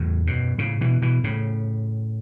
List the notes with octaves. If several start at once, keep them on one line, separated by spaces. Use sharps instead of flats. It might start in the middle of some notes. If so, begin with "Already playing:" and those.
Already playing: E2 A2
F#2 B2
A2 C#3
B2 E3
B2 E3
A2 C#3